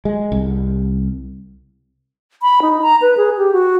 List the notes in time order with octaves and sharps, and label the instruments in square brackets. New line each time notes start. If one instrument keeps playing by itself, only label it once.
[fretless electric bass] G#3
C2
[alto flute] B5
D#4
A#5
B4
G#4
G4
F#4